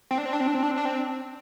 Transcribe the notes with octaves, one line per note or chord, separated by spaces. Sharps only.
C4
D4
C4
D4
C4
D4
C4
D4
C4
D4
C4